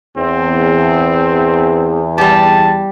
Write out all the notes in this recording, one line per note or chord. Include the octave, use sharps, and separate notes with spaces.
E2 C4
G3 G4 A5